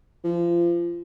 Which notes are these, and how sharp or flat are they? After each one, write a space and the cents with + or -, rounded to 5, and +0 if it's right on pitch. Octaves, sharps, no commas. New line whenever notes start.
F3 -30